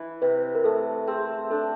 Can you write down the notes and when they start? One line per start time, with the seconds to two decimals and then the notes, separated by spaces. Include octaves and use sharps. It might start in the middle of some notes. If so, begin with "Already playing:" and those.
Already playing: E3
0.22 C3 B4
0.55 A#4
0.64 A3 A4
1.07 C4 G#4
1.50 D4 A4